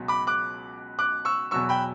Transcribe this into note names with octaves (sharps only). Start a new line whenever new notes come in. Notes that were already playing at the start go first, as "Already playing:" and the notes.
Already playing: C#2 B2 F#3
B5 D6
D6 F#6
D6 F#6
C#6 E6
E2 B2 F#3 C#6 E6
G5 B5